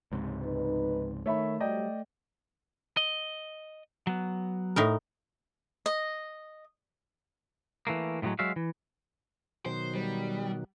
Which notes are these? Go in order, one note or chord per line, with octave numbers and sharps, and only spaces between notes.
C#2 G#2 C3
D2 D#4 B4
D#3 A3 C#5 E5 B5
F#3 G3 D5 D#5 G5
D#5
F#3 B3
A2 D#4 A#4
D#5
E3 A3 A#3
A2 C3 F3 F#3 G#3
F#3 G#3 F#4 E5 F5
E3
B2 D#3 F#3 C5
G3